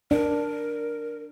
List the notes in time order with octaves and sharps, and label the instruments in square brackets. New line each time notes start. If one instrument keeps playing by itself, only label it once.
[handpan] D4 [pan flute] A#4